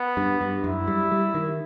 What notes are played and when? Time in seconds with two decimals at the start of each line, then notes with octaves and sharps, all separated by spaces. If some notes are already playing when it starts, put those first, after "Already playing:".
Already playing: B3
0.17 G2
0.41 G2
0.64 F#2 E4
0.88 G3
1.12 G3
1.35 D#3